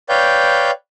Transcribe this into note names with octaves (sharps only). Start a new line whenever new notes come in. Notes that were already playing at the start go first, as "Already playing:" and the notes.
B4 C#5 D5 F5 G5 G6